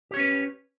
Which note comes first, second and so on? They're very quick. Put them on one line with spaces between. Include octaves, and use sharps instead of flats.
G4 C#5 C#4 B4